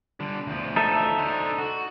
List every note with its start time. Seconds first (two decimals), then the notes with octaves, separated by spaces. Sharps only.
0.20 D3 G3
0.47 D2 F3
0.76 D#4 A4 E5
1.18 D3 C5
1.58 F#4